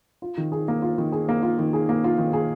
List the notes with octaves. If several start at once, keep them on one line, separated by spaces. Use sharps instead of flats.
F4
D#3
G#4
A#3
F4
D#3
G#4
A#3
F4
D#3
G#4
A#3
F4
D#3
G#4